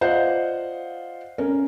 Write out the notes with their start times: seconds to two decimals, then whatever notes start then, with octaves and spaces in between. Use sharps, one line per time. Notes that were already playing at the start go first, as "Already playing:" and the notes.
0.01 F4 C5 D5 D#5 F5 F#5
1.38 C#4 A#4